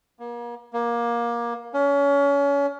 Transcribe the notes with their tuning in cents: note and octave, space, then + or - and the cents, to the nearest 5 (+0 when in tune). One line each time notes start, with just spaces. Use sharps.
A#3 +35
A#3 +20
C#4 +30